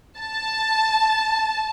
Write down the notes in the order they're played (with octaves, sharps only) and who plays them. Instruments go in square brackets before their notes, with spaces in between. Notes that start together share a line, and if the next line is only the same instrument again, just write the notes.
[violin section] A5